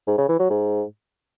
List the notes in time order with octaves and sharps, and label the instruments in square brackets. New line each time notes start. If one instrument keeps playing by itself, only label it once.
[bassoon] G#2
C#3
E3
F#3
G#2